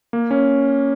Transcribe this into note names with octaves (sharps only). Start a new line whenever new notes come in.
A#3
C#4